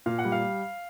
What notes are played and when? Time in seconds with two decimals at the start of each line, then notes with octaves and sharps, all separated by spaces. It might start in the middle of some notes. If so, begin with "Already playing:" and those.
0.06 A#2 F5
0.19 F#5
0.25 G3
0.32 F5